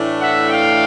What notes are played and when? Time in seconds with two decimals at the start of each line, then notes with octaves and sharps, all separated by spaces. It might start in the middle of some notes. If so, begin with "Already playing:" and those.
Already playing: A2 E3 A3 D4
0.20 E5 F#5
0.50 F5 G5